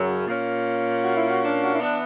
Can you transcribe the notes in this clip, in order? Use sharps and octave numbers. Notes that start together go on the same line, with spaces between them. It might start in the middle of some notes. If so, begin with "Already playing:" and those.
Already playing: F#2 C#3 F#3
A#2 A#3 C#4
F#4
E4
F#4
D4
F#4
E4
E3 B3 D4